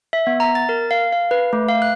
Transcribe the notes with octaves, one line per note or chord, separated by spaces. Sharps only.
E5
B3
A#5
A6
A#4
F5
F5
B4
A3
F5
F#6